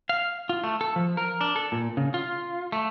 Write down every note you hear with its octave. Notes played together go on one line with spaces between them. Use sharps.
F5
F4
A3
A4
F3
A#4
D4
A4
A#2
C#3
F4
A3